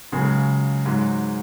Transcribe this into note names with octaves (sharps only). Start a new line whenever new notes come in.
C#2 C#3 F#3 G#4
G#2 F#3